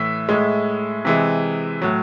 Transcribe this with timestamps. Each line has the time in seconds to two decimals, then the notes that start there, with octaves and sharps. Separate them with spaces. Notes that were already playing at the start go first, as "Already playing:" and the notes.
Already playing: A2 E3 E5
0.29 A2 G#3
1.05 C3 E3 G#3
1.82 A2 F#3